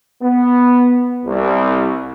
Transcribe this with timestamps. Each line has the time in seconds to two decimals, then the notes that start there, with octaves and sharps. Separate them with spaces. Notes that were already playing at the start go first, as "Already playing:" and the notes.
0.23 B3
1.26 C2